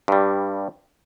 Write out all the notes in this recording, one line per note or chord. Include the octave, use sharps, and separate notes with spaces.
G2 G3